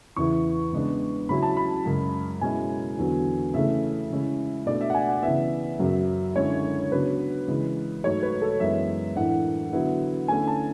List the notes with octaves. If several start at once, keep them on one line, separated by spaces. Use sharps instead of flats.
E2 C#3 E3 B3 E4 C#6
C#3 G#3 B3 D4
C#3 F#3 C#4 E4 B5
A5
B5
F#2 C#3 G#3
B2 G#3 C#4 E4 G#5
E2 D3 F#3 B3
C#3 E3 A3 C#4 E5
C#3 G#3 C#4 E4
B2 A3 D4 D5
E5
F#5
G#5
F#5
C#3 E3 B3 E5
F#2 C#3 F#3
D3 G#3 C#4 E4 C#5
C#3 F#3 B3 D4 B4
C#3 E3 G#3
G#2 F#3 A3 C#5
B4
A4
F#2 E3 G#3 B3 E5
A2 E3 A3 D4 F#5
D3 F#3 B3 E4
D3 A3 C#4 E4 G#5
A5